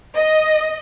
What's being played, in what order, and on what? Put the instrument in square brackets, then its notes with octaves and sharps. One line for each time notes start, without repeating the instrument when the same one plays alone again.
[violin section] D#5